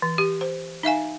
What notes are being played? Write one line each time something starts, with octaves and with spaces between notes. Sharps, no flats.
E3
G4
C5
D#4 E5 F5 G#5